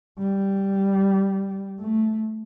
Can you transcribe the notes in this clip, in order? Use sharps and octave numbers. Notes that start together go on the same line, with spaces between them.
G3
A3